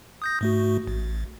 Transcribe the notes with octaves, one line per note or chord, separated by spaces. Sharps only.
D#6 G6 A#6
G#2 A3 F#4
A1